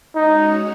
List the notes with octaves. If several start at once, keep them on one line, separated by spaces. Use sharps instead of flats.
G#3 C#4 D#4 F#4 C#5